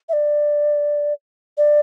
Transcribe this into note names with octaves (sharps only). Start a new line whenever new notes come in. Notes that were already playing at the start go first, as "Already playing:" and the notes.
E5
D5
D5